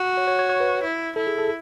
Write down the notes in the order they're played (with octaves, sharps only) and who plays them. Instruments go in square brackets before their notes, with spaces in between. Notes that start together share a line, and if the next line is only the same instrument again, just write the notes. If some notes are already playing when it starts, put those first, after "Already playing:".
Already playing: [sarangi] F#4
[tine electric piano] C#5
C#5
C#5
C#5
B4
[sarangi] E4
[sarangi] E4 [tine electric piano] A4
[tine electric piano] G#4
A4